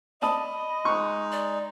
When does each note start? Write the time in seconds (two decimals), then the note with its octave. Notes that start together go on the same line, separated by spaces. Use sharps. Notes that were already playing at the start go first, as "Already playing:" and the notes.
0.22 D5 D#5 A5 B5 D#6
0.85 G#3 D#4 C#6 F#6
1.32 D5